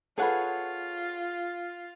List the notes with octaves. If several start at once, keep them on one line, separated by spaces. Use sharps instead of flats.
F4 G#4 A4 B4 C#5 F#5